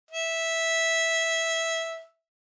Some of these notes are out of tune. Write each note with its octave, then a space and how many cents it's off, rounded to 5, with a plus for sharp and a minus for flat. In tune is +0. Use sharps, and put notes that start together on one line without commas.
E5 -10